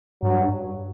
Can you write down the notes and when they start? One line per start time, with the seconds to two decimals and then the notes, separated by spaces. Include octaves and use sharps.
0.22 G2 F#3